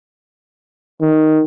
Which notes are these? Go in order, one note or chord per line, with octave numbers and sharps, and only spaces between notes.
D#3